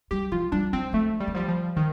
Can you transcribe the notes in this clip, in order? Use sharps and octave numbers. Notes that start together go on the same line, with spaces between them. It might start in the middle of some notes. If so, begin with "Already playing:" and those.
G3 G4
F3 F4
G3 D4
F3 C4
F3 A3
G3
D#3
F3 G3
F3
D#3 F3